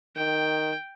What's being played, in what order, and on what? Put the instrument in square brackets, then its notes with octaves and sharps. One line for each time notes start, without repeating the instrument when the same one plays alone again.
[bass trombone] D#3 [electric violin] G5